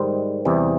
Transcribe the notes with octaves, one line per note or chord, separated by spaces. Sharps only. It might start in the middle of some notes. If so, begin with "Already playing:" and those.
Already playing: G#2 D#3 G3 C5
E2 C3 E3 G3